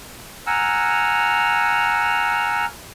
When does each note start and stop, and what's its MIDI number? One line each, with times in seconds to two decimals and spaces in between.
0.47 2.65 78
0.47 2.65 80
0.47 2.65 82
0.47 2.65 88
0.47 2.65 89